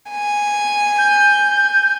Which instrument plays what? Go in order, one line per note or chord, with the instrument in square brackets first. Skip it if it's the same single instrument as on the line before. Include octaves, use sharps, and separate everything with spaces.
[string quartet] G#5
[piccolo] G6